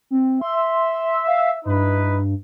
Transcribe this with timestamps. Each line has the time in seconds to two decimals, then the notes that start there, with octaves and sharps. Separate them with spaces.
0.11 C4
0.41 E5 C6
1.27 F5
1.66 G2 D#4 E4 B4